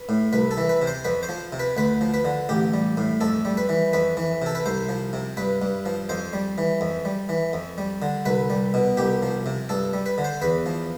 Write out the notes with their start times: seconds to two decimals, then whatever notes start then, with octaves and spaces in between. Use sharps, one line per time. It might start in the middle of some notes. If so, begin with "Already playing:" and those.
Already playing: B4
0.09 A2
0.33 C2 B4
0.51 A4
0.57 E3
0.69 B4
0.82 C3
0.87 C5
1.05 F2 B4
1.23 C5
1.29 F3
1.52 C3
1.60 B4
1.77 D2 B4
2.01 F3
2.14 B4
2.25 D3
2.49 A1 G4
2.74 G3
2.97 A2
3.21 F2 A4
3.45 G3
3.57 B4
3.69 E3
3.93 F2 B4
4.17 E3
4.42 C3 A4
4.55 B4
4.66 C2 C5
4.89 F3
5.13 C3
5.37 G2 B4
5.62 G2
5.86 F3
6.09 F2 C5
6.33 G3
6.58 E3
6.81 F2
7.05 G3
7.29 E3
7.53 F2
7.78 G3
8.02 D3
8.26 C2 B4
8.50 G3
8.74 B2
8.97 C2 G4
9.22 F3
9.46 C3
9.69 G2 A4
9.93 G3
10.06 B4
10.18 D3
10.24 C5
10.42 E2 B4
10.66 F3